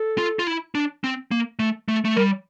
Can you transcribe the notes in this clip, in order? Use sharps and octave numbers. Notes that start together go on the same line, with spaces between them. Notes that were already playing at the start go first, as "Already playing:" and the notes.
Already playing: A4
F4
F4
E4
D4
C4
A#3
A3
A3
A3
G3 A#4